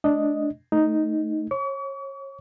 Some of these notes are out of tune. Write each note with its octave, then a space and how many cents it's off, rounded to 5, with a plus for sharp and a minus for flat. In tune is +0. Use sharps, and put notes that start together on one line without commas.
A3 -35 D4 +0 D#5 +0
A3 +0 D#4 +0
C#5 -30 C#6 +45